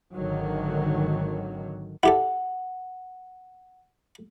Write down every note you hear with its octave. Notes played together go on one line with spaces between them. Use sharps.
G#1 D3 D#3 F#3
E4 G4 A4 F#5